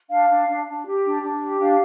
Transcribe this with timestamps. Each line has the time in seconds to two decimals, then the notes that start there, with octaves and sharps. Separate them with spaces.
0.10 D4 F5
0.29 D4
0.48 D4
0.67 D4
0.86 G4
1.04 D4
1.22 D4
1.41 G4
1.60 D4 F5